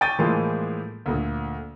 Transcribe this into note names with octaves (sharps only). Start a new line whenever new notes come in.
G5 C#6 D6 G6 A6 D#7
A2 E3 F3 G#3 A#3 C6
D2 A#2 D3